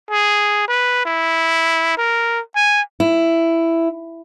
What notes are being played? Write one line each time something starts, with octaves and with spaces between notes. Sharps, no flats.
G#4
B4
E4
A#4
G#5
E4